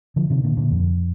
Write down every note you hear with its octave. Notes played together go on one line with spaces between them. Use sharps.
D3 F3
C3 D#3
A#2 D3
A#2 D3
F2